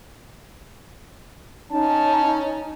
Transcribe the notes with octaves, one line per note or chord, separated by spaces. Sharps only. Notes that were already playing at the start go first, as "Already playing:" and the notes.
C#4 D#4 A5